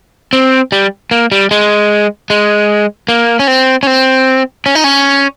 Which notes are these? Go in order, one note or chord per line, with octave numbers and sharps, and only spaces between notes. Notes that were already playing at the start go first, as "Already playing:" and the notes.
C4
G3
A#3
G3
G#3
G#3
A#3
C#4
C4
C#4
C4
C#4
D#4
C#4